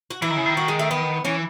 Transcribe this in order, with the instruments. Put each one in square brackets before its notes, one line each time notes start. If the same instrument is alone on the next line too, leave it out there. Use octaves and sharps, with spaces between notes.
[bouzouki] F#4
[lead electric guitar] E3 [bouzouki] E4
[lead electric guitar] D#3
C#3
D#3
[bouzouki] F#4
G#3
A3
B3
[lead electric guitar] E3 [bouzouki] C#4